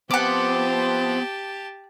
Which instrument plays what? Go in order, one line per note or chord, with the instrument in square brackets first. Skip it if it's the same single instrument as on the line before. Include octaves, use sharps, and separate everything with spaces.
[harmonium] F3 C4 C5 [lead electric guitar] B3 [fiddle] G4 A5 [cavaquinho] F#5 D6